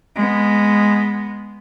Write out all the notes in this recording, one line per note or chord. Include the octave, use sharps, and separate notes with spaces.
G#3 B3